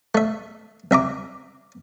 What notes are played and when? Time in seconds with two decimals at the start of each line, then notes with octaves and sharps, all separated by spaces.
0.15 A3 E5
0.91 C2 E5 A#5 D6